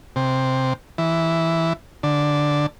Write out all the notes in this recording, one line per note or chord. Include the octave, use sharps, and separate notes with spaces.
C3
E3
D3